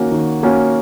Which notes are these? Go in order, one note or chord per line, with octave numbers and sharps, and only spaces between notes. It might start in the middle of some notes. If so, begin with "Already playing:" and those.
Already playing: D#3 A#3 C#4 F#4
D#3
A#3 C#4 F#4